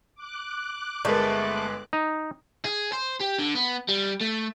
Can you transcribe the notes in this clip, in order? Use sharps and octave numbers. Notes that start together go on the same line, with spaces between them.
D6 F#6
G1 G#3 A3 A#4 B4 D5
D#4
G#4
C5
G4
D3
B3
G3
A3